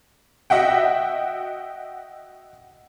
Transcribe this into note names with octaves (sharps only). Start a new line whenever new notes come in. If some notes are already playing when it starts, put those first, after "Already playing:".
F#4 D#5 E5 F#5 G5